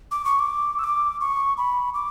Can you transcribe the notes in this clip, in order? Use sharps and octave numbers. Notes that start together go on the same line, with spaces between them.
D6
C#6
D6
E6
D6
C#6
B5
D6